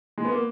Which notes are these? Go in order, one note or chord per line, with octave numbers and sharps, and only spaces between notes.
G#3
B3
A#3